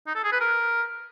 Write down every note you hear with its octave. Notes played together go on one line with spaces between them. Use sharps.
D#4
A4
G#4
B4
A#4